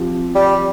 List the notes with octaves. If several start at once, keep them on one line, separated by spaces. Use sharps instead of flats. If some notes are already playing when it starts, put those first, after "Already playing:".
Already playing: F3 C4 G4
G3